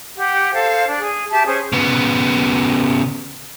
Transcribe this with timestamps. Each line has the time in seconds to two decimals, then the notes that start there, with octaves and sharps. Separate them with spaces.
0.17 G4 F#5
0.53 A4 C5 F5
0.86 D4
1.00 G#4
1.30 G4 E5 A5
1.46 C#4 G#4 C5
1.73 C#3 B3